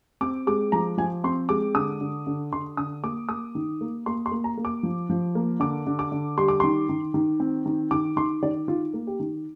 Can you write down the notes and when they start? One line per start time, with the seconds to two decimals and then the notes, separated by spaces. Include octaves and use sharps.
0.21 C4 D6
0.47 G#3 D6
0.72 F3 A#5
0.98 F3 G#5
1.24 C4 C6
1.49 G#3 D6
1.75 D3 D#6
2.01 D3
2.27 D3
2.52 D3 C6
2.77 D3 D#6
3.03 A#3 D6
3.29 A#3 D#6
3.55 D#3
3.81 A#3
4.06 A#3 C6
4.26 C6
4.31 A#3
4.44 A#5
4.58 A#3
4.65 D6
4.83 F3
5.10 F3
5.35 A#3
5.60 D3 D6
5.87 D3
5.99 D6
6.12 D3
6.37 G3 C6
6.48 D6
6.60 D#3 C6
6.89 D#3
7.14 D#3
7.40 C4
7.66 D#3
7.91 D#3 D6
8.17 D#3 C6
8.43 D#3 D5
8.68 D#3 F4
8.94 A#3
9.07 G4
9.20 D#3